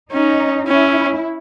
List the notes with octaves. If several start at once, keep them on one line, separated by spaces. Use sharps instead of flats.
C#4 D#4
C#4 E4